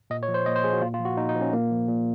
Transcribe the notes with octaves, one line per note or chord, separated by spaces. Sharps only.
A#2 D#5
C#5
F3
C5
A#2 D#5
C5
F3 G#4
F#4
A#2 F4
F4
F3
F#4
A#2 D#4
D#4
F3
C#4
A#2 A#3
F3
A#2